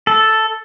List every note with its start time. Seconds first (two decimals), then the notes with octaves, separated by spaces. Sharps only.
0.07 A4